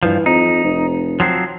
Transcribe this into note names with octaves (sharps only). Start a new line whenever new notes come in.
G2 E3 F3
F2 D#4
F1
F3 F#3 C4